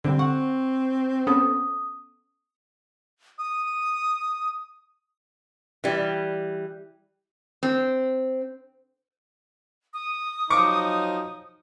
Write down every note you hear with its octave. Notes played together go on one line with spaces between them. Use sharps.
D3 G3 C4
F#5 C#6
B3 C#4 A4 D#6
D#6
E3 G3
C4
D#6
F3 F#3 D#4 C#6 D6